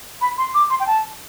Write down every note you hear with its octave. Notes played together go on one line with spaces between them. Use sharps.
B5
C6
D6
C6
G5
A5